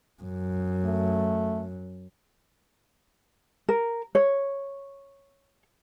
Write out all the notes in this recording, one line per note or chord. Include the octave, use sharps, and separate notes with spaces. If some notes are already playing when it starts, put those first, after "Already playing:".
F#2
A3
A#4
C#5